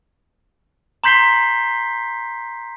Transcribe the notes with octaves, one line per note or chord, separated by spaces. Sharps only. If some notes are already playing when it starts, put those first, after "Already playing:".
A#5 C6 G6 B6 C7 G7